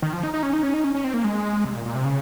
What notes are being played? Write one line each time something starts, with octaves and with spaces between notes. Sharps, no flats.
D#3
F3
D#4
D#4
C#4
D#4
C#4
D#4
C#4
C#4
C4
A#3
G#3
C3
A#2
A#2
C3
C#3